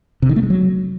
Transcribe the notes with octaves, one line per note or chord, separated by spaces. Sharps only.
C3
D#3
A3
G#3
F#3